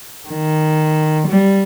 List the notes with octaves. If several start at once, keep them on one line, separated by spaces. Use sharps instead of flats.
D#3
G3